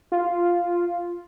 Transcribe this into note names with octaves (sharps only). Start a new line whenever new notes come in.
F4